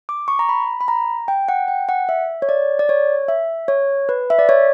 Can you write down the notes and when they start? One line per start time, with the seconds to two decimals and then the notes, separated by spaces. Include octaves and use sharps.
0.09 D6
0.28 C#6
0.39 A#5
0.49 B5
0.81 B5
0.88 A#5
1.28 G5
1.49 F#5
1.68 G5
1.89 F#5
2.09 E5
2.42 C#5
2.49 D5
2.79 D5
2.89 C#5
3.28 E5
3.68 C#5
4.09 B4
4.30 E5
4.39 D5
4.49 C#5